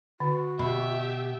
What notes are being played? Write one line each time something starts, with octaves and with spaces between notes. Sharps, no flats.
D3 F#4
B2 G4 E5 B5